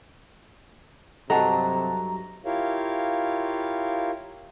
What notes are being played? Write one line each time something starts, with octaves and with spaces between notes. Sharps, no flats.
G2 C3 F#3 A4 D#5 F#5 A5 A#5
E4 F4 G4 A#4 C#5 F5